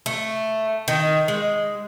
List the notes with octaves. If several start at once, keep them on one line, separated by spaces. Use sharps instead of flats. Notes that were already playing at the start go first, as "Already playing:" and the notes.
A3
D#3
G#3